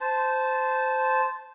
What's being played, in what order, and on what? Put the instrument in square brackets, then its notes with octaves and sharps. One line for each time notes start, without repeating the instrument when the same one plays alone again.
[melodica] C5 A5